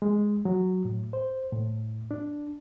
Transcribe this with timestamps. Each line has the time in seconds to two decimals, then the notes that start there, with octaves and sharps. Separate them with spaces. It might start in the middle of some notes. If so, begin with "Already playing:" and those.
0.02 G#3
0.45 F#3
0.85 A2
1.13 C5
1.53 A2
2.11 D4